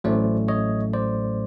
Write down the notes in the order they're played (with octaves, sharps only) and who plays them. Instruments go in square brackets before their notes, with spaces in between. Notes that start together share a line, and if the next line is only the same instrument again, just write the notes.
[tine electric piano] A1 A2 F#3 A3 C#4 C5 D5
C#5 D#5
C5 D5